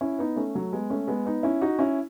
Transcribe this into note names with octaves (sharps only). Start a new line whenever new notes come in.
C#4 E4
B3 D#4
A3 C#4
F#3 A3
G#3 B3
A3 C#4
G#3 B3
B3 D#4
C#4 E4
D#4 F#4
C#4 E4